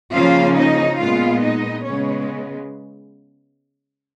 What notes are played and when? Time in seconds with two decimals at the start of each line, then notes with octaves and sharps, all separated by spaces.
0.12 C#3 F3 A#3 C#4 F4 F5
0.56 D#4 D#5
0.98 A#2 G#3 B3 F4 F5
1.42 D#4 D#5
1.85 C#3 G#3 B3 C#4 C#5